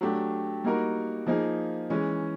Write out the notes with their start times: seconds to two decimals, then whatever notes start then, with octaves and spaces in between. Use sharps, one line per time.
0.01 F#3 A3 D4 G4
0.64 G3 A#3 D#4 F#4 A#4
1.27 F3 A#3 D#4 G#4
1.90 E3 G#3 C#4